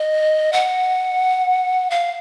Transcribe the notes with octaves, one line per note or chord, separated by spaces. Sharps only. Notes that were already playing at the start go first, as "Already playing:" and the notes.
Already playing: D#5
F#5
F5